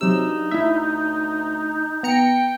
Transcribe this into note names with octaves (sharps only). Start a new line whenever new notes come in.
C3 F#3 D#4 E6
G2
D2 E4 E5
B3 G5 A#5 C#7